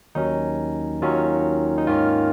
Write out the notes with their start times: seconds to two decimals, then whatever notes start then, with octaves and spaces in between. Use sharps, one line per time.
0.15 D#2 D#3 F#3 C#4 D#4
1.01 D#2 D#3 F#3 C#4 F4
1.78 D#4
1.87 G#2 D#3 A#3 C#4 F4